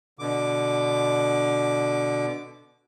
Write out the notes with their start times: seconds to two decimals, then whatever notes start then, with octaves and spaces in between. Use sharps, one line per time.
0.19 B2 D3 D6